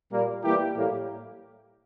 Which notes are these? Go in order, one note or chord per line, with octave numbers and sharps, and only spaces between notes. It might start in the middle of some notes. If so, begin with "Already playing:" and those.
A#2 G3 A#3
E3 G3 A#3 E4 G4
A2 G3 A#3